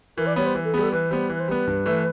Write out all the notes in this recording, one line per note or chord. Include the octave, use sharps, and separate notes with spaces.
E3 A#4
D5
G3 B3 C#5
C5
E3
A4
G3 B3 G#4
A4
E3 B4
G3 B3 C5
E3 B4
C5
G3 B3 B4
G2
E3 A3